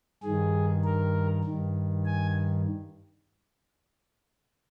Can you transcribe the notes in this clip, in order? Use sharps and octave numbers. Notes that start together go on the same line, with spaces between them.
G2 D#3 G#4
A#4
G2 D#3
G#5